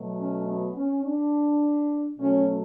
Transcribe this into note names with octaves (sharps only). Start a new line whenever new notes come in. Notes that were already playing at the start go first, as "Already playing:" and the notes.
Already playing: B2 F#3 A3
C#4
B3
C#4
D4
B2 F#3 A3 C#4